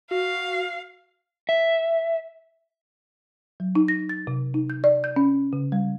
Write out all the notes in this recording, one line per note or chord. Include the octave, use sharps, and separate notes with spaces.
F#4 F5
E5
F#3
D#4
A#6
A6
C3
D#4
G6
D5
G6
C#4
C#3
G3